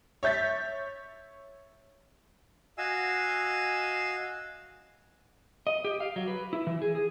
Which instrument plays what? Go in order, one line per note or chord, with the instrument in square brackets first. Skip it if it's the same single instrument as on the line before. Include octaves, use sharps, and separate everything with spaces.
[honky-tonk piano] C#5 E5 G6 A6 B6
[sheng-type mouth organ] F#4 D#5 F5 G#5 E6
[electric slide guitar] D#5
G4
F5
F#3
B4
E4
E3
G#4
G#4